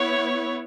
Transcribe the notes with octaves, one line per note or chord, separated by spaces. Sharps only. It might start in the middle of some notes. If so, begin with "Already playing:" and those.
Already playing: B3 E4 C#5